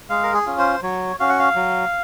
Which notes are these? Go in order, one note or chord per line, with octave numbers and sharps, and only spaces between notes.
G#3 F5
A#4
G#4
C#4 F4
C5
F#3 C#5
C#4 F#4 F5
F#5
F5
F#3